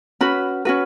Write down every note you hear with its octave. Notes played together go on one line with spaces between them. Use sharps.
C#4 F#4 B4 B5
C#4 F#4 B4